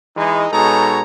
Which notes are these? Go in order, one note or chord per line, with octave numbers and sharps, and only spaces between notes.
E3 G#3 D#4
B2 G#3 D#4 A4 C#5 A#5